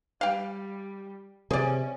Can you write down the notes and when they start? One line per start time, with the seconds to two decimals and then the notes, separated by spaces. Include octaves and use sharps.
0.21 G3 F5 G5
1.51 C3 C#4 G#4 D5